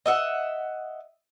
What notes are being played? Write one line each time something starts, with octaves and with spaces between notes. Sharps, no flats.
D#5 E5 F#5